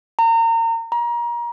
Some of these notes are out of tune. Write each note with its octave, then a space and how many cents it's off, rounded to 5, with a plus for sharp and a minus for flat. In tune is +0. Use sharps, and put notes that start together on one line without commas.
A#5 -30
A#5 +30